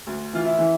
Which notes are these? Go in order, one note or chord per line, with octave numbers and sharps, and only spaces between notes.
D2
E3 F4
E4
E3